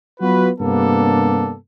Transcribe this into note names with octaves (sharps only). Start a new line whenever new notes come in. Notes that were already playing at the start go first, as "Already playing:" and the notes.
F#3 B3 F4 F#4 B4
G2 C3 A#3 B3 D4 A4